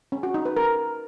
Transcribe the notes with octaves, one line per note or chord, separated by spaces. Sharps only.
C#4
F#4
D#4
B4
A#4